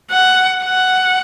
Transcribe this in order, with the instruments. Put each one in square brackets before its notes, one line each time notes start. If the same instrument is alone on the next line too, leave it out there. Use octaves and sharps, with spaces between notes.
[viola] F#5
F#5